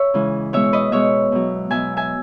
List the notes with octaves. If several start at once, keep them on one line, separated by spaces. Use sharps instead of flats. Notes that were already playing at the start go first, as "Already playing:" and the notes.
Already playing: C#5 E5
C#3 E3 G#3
B2 G#3 C#5 E5
B4 D#5
B2 G#3 C#5 E5
B2 F#3
B2 F#3 E5 G#5
E5 G#5